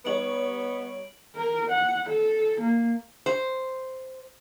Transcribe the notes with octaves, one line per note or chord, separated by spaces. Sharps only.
G3 B3 D#4 C#5 D7 F#7
A#4
F#5
A4
A#3
C5